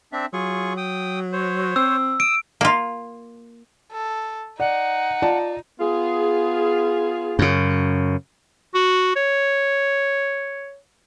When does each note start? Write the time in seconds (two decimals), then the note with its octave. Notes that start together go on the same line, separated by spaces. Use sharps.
0.13 C4 D4 E5
0.33 F#3 F4 G#4 C#6
0.77 G5 D#6
1.33 C5 C#5
1.76 C4 E6
2.20 D#6 E6 D7
2.61 A#3 F4
3.92 A4
4.60 D#4 D5 F#5
5.22 F4 D5 A5
5.80 B3 F4 G#4
7.39 F#2 C#3
8.75 F#4
9.16 C#5